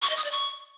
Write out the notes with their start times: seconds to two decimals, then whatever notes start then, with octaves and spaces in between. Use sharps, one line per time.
0.02 C#6
0.10 D#5
0.17 D#6
0.24 D5
0.32 C#6